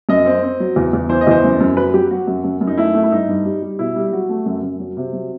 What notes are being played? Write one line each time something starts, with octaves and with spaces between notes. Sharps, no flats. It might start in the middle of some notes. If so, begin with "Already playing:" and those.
F#2 D#5
C4
C4
F#3
E2
E2
E3 C5
D#5
E2 C5
F#2
F#2
F#3 B4
F#3 G4
F#3 F#4
F#2
F#2
F#2
D#4
A3 E4
A3
E4
G2 D#4
G2
G3
G3
B2 E4
G3
F#3 F#4
A3
F#2
F#2
F#3
C3
F#3